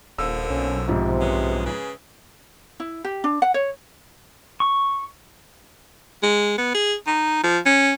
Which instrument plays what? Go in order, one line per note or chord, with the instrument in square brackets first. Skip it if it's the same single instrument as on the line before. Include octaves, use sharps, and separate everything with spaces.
[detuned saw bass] D#1 [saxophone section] D3 F3 A#3 [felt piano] E6
[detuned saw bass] B1 [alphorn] C#4
[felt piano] G#2 F3 [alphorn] C3
[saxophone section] G#3 B3 C#4
C#3 G#4 B4
[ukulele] E4
G4
D4
F#5
C#5
[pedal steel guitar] C#6
[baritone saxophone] G#3
B3
G#4
D#4
F3
C#4